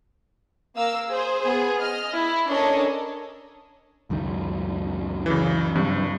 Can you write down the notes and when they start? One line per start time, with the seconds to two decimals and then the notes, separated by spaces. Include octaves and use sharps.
0.76 A#3 A#4 F5 E6
1.08 G#4 C5
1.41 B3 G#4
1.79 D#5 F6
2.15 E4
2.50 C#4 D4 A4 A#4 C#5 D#5
4.10 C#2 F#2 D#3
5.26 C#3 E3
5.75 G2 F#3 G3 C4